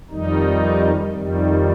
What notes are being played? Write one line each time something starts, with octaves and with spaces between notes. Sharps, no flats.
F2 D#3 G3 D#4
F2 D#3 G3